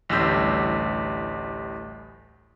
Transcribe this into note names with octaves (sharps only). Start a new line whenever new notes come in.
A1 D2 A2 G3 E6 G6